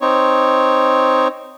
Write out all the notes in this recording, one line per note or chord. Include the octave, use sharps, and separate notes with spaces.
C4 D#4 C#5